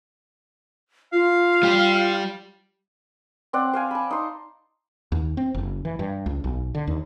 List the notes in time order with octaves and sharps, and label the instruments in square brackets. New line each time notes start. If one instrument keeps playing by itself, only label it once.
[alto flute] F4 [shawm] F5
[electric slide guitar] G3 G4
[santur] C4 D5 F#5
C5 F5 G#5
A5 B5
D#4 C6
[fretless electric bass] D#2
C4
F#1
E3
G2
C#2
B1
D3
D#2